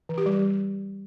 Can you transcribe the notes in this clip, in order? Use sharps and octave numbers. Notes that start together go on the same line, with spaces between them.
E3
G4
G3